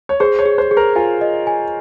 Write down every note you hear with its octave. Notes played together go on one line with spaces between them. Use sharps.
C#5
G#4 C5
C#5
G#4
C5
G#4
A#4
F4 G#5
D#5
G#5